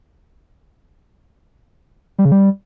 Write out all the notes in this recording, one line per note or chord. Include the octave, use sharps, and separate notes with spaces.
G3
C#3
G3